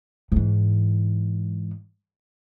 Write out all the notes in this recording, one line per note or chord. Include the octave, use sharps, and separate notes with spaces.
G#2 E3